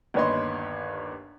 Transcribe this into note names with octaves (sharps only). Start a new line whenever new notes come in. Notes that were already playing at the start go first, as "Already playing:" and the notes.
G1 D#2 B4 C#5 D#5 C6